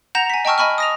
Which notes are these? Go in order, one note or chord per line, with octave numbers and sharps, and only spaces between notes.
F#5 A#5 G6 A#6 E7 F7
G#5 B6
D#5 G5 A5 C#6 E6 F6
D#5 G#5 B5 C#6 F6
D#6 A#6 F7